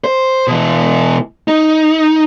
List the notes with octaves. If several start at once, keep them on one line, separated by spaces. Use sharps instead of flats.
C5
B2 E3
D#4